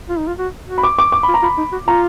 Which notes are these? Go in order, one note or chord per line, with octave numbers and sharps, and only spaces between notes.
F4
D#4
F4
F#4
F#4
B5
D6
D6
D6
B5
F4
A#5
F4 B5
D#4
F#4
F4 A#5